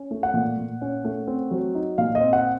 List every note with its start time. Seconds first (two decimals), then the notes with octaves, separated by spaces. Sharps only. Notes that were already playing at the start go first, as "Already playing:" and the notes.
Already playing: C#4
0.11 A3
0.23 F#5
0.34 A#2
0.57 A#2
0.81 C#4
1.05 A3
1.27 C4
1.51 F#3
1.75 D#4
1.98 A#2 F5
2.15 D#5
2.21 C4
2.33 F#5